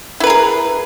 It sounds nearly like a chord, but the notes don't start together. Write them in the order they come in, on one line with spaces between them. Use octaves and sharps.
E4 B4 A#4 G#4